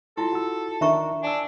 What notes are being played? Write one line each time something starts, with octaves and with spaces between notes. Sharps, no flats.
E4 F4 A4 A5 C6
F#4 E6
D#3 D4 A#4 E5 A#5 C#6
D4 G#5 E6